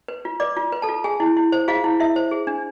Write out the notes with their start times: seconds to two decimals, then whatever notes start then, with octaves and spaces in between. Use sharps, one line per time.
0.08 B4
0.25 F4
0.40 B4 D5 D6
0.56 F4
0.72 B4
0.82 A4 A5
0.89 F4
1.04 G#4 G#5
1.20 E4
1.37 E4
1.52 C5
1.68 F4 G#4 F5
1.84 E4
2.00 E4 E5
2.16 C5
2.31 G#4
2.47 D4